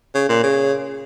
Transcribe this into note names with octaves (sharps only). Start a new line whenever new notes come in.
C#3
A#2
C#3